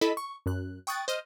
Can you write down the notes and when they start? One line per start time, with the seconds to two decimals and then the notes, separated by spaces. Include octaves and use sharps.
0.01 E4 A4 D#5 B5 B6 E7
0.17 C#6
0.46 F#2 F#6
0.87 G5 C#6 D#6 F#6 A6
1.08 C5 D#5 F6